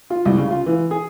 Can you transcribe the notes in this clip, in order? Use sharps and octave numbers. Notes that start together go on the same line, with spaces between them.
F4
C2
C#3
F4
E3
G#4